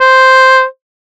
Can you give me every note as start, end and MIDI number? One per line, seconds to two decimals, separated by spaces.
0.01 0.64 72